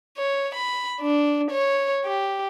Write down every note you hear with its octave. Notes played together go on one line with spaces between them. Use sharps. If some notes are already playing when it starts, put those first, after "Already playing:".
C#5
B5
D4
C#5
G4